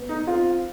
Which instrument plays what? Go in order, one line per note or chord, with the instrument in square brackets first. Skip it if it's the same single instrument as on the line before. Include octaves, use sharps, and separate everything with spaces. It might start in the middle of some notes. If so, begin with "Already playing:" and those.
Already playing: [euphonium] B3
[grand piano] D#4
[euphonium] C4 [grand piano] F4